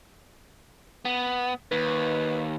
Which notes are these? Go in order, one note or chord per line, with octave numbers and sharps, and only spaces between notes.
B3
D#2 B4